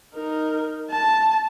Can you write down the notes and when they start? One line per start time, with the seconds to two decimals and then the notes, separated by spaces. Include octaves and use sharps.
0.15 D#4 A#4
0.91 A5